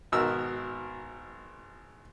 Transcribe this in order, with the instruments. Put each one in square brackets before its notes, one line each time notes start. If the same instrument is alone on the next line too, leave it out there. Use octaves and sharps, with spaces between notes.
[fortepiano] G#1 B2 A#4 E6